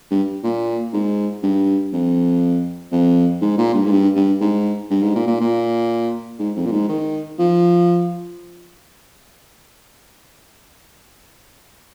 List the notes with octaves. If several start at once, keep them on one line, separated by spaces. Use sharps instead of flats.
G2
A#2
G#2
G2
F2
F2
G#2
A#2
G2
G#2
G2
G2
G#2
G2
G#2
A#2
A#2
A#2
G#2
F2
A#2
G#2
D#3
F3